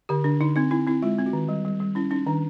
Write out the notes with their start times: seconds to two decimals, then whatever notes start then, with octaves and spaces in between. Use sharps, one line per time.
0.09 D3 G4
0.24 D3 D4
0.41 D3 D#4
0.56 C4 D#4
0.71 C4 E4
0.87 C4 E4
1.02 G#3 F4
1.19 C4
1.26 F#4
1.33 D#3
1.49 G3
1.65 G3
1.80 G3
1.95 C#4 E4
2.11 C#4 D#4
2.26 D#3 D4